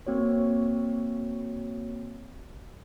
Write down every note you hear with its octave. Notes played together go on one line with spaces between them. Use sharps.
A#3 C4 F#4 C#5